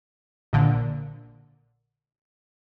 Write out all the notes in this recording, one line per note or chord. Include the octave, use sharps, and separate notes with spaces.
A#1 A#2 D3